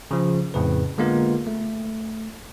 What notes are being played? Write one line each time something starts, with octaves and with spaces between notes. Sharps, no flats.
C#3 F3
F2 A2 C#3 B4
D3 G#3 A#3 B3 F4 A#4
A3